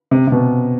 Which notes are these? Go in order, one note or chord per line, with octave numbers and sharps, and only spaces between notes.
C3
C3
B2